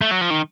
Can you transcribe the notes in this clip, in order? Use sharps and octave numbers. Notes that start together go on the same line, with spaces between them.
A3
F#3
F3
D#3